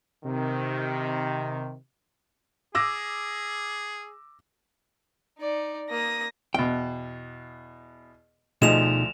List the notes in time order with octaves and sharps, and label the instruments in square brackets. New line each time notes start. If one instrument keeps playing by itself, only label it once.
[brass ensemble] C3 D#3
[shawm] G#4 [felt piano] D6 E6 A#6
[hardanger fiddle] D#4 D5
[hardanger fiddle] A#3 D#6 [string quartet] A#6
[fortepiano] E2 B2 [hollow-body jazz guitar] G5
[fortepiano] D2 F3 D#5 [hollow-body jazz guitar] B2 D#4 G#4 [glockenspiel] E7 F7